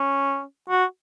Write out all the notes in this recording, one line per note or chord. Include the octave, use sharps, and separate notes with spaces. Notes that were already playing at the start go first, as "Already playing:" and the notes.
Already playing: C#4
F#4